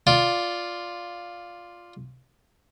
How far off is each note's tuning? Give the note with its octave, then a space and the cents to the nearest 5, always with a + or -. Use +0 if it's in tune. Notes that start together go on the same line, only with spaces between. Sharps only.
F4 +0 D5 +0